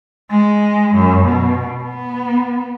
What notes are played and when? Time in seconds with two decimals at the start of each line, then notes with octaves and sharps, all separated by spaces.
0.31 G#3
0.95 F#2
1.25 B2
1.83 B3